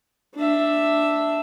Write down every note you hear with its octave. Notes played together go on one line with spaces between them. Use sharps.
D4 E5